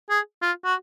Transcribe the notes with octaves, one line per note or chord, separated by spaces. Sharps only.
G#4
F4
F#4